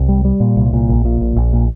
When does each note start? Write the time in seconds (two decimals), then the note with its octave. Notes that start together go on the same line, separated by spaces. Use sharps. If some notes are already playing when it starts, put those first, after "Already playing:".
Already playing: C2
0.09 G3
0.25 G3
0.40 A#2
0.56 C2
0.73 A#2
0.89 A#1
1.05 A#2
1.21 A#1
1.36 A#1
1.53 A#2